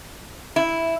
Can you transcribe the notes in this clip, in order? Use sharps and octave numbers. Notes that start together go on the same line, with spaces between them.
E4